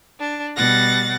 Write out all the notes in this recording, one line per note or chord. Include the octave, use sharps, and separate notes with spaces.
D4
B2 G3 F#5 A6 A#6